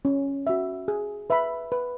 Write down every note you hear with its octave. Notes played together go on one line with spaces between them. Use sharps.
C#4
F#4 E5
G#4
B4 E5 B5
B4